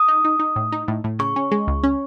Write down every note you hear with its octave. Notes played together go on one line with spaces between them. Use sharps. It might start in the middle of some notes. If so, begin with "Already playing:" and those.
Already playing: D#6
D#4
D#4
D#4
A2
D#4
A2
A2
C#3 C#6
C#4
G#3
C#2
C#4